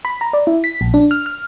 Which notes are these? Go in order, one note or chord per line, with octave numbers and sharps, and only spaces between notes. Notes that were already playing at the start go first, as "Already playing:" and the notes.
B5
A#5
D5
E4
B6
A#1
D4
F6
F6